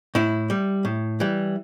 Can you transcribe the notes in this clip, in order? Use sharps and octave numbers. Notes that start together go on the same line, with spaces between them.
A2 E4
G3
A2
E3 G3